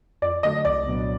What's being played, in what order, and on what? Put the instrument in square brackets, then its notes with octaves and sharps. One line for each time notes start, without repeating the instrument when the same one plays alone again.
[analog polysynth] F2 [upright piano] D5
[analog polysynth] D3 F#3 A3 [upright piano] D#5
[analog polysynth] C2 [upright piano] D5
[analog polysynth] A#2 F#3 B3 D4